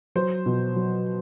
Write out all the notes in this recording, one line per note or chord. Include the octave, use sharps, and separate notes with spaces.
F#3 C5
B2
F#3